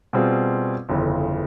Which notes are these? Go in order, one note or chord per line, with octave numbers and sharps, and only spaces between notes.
B2 G3 C4 F4 G#4
G1 F2 C#3 E3